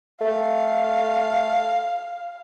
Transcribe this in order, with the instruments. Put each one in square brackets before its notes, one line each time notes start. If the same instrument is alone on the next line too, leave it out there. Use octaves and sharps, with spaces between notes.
[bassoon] A3 [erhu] F5